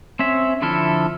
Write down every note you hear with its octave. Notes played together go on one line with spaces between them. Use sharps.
C4 C#4 E5
D3 F3 E4 A4 F6